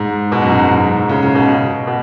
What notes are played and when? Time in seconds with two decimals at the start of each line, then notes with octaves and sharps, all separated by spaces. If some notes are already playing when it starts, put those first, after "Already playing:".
Already playing: G#2
0.32 B2
0.42 F#2
0.51 G#2
0.70 G#2
1.09 C#3
1.23 C#3
1.35 B2
1.87 B2